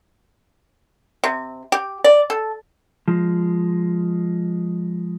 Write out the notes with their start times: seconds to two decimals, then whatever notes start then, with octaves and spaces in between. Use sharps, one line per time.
1.24 C3
1.72 G4
2.04 D5
2.30 A4
3.08 F3 G#3